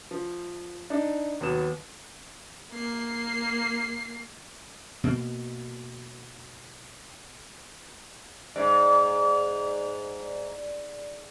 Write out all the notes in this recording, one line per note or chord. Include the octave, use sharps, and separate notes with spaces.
F3
D4 D#4
D#2 F#3 B3 D#6 E7
A#3 C7
B2 A#3
G#2 D5